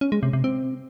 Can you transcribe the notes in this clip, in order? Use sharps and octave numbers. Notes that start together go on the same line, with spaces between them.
C#4
G#3
C3
C3
C4